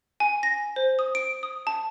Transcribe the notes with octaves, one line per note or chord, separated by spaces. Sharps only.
G#5
A#6
C5
D#6
D7
D#6
A5